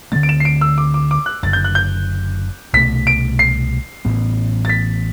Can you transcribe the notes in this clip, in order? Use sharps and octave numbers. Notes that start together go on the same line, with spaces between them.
D2 D3 A3 C4 A6
D7
E7
C7
D7
E6
D6
D6
D6
F#6
F#1 F#2 D3 A6
G6
F#6
G6
C2 B2 A3 B6
D7
C7
A1 A2 E3 B3
A6
B6